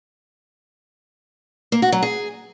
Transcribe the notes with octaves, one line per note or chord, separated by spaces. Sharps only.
A#3
F#4
F#3
G#4